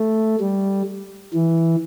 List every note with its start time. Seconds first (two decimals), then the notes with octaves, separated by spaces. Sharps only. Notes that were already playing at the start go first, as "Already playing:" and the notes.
Already playing: A3
0.40 G3
1.33 E3